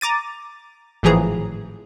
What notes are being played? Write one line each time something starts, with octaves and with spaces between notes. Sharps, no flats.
A#5 D6 A6 D#7
G#1 A2 E3 F3 G#4 A#5